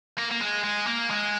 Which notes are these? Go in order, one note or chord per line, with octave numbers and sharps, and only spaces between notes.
A#3
A#3
G#3
G#3
A#3
G#3